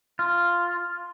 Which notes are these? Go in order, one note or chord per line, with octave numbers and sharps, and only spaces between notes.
F4